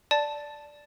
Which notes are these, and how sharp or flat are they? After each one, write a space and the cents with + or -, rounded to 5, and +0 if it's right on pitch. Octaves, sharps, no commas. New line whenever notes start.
D5 +0 A5 +0